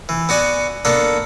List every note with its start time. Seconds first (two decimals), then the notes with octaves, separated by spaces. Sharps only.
0.09 E3
0.29 B3 F#4 D5 G#5
0.85 A#3 B3 D4 A4